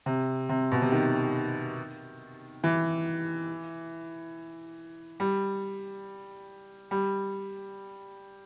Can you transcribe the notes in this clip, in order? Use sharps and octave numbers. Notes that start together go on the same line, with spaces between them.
C3
C3
B2
C3
D#3
E3
G3
G3